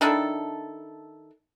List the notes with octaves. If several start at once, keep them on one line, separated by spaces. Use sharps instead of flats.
D#3 D4 E4 A4